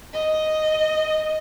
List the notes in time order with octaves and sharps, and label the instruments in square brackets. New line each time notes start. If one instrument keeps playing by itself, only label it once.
[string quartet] D#5